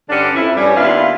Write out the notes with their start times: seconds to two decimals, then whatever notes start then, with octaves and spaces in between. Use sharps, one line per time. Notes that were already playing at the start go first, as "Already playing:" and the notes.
0.09 G2 D3 C#4 D4
0.35 F2 E4
0.57 G2 G3 C#4
0.76 D#2 B3 D4 E4 F4 F5